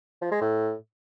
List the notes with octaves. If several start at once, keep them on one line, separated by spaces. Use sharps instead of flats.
F3
G#3
A2